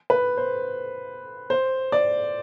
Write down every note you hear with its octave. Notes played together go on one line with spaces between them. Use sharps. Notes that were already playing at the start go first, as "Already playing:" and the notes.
B4
C5
C5
D5